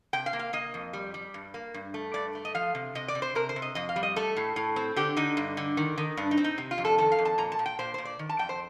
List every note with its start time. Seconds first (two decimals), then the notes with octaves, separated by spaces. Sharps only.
0.13 C3 G5
0.26 F5
0.33 A#3
0.39 F5
0.53 A#3 D#5
0.74 F2
0.93 G3
1.14 G3
1.34 G2
1.54 A#3
1.74 G2
1.94 A3
2.14 G2 D5
2.35 A3
2.45 D#5
2.55 F3 F5
2.75 C3
2.95 C3 D#5
3.08 D5
3.15 C3
3.22 C5
3.35 C3 A#4
3.49 C5
3.56 C3
3.62 D#5
3.75 F2 D#5
3.89 F5
3.96 G3
4.03 D#5
4.16 A3 A4
4.37 A2
4.56 A2
4.76 C4
4.96 D3 G4
5.17 D3 D#4
5.37 G2
5.57 D3
5.77 D#3
5.98 D#3
6.17 G2 D4
6.31 D#4
6.37 C4
6.44 D#4
6.58 C3
6.71 F4
6.78 F2
6.85 A4
6.98 D#3 A4
7.12 F5
7.19 F2
7.25 A5
7.38 A#2 A#5
7.52 A5
7.59 A#2
7.66 G5
7.79 A#2 C5
7.94 A#2 C5
8.05 D5
8.19 D#3
8.29 A5
8.39 F2 G5
8.49 C5